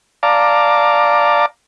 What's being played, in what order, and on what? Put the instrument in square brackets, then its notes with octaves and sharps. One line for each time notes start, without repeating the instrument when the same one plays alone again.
[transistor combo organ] D5 F5 A5 A#5 D6